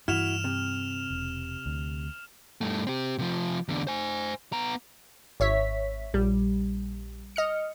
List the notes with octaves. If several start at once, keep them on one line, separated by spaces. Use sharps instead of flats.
G2 E3 E4 F#4 F6 E7 F7
C3
E1
D2
G2 A3
C4 G4
C3 F3
E2 D3
C5 G#5
B3 A#5
G#1 C#5 E5 B6
A#1 G3
D#5 F6 C#7